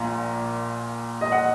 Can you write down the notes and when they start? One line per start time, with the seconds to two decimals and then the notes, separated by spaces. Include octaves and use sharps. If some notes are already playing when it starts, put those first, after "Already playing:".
Already playing: A#1 A#2
1.21 D#5
1.32 F#5